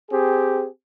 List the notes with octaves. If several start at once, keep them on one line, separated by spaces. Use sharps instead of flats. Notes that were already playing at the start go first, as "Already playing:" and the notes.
C4 G4 G#4